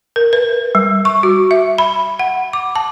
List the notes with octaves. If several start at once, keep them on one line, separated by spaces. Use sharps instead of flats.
A#4
B4
G3
C#6
F#4
E5
B5
F#5
D6
A5